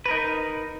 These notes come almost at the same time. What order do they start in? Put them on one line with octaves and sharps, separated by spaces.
B4 A#4 D#4